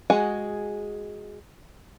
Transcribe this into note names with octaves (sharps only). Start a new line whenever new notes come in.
G#3 F#4 G#4 F#5 G#5